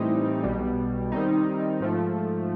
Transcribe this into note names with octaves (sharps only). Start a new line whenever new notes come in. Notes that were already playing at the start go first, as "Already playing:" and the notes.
Already playing: A2 E3 G3 C4 D#4
B1 B2 G3
D#3 G3 C4 D#4
G#2 F3 A3